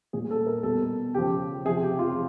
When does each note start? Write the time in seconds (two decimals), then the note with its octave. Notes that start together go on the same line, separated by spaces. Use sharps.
0.13 A#2 G3 G#4
0.31 A4
0.46 A#4
0.63 B2 G3 A4
1.14 C#3 F3 G4
1.65 C3 G#4
1.69 F3
1.83 G4
1.99 F4